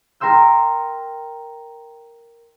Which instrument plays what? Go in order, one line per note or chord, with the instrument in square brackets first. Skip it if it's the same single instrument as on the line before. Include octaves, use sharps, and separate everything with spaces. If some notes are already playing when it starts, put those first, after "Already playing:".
[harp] A#4 G5 C6 E6 G6